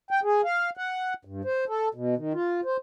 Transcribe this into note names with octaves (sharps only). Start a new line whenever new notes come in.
G5
G#4
F5
F#5
G2
C5
A4
B2
D#3
F4
C5